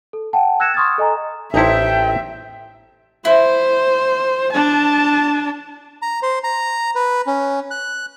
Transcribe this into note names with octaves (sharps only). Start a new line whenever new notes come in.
A4
F#5 G5 A5
E6 F#6 G#6 A#6 C#7 E7
C6 C#6 D#6 F6 G#6 A6
A4 D#5 G#5 A#5
A1 D#4 E4 A4 C5 E5 G5
E4 C5
D4 A5
A#5
C5
A#5
B4
C#4
F#6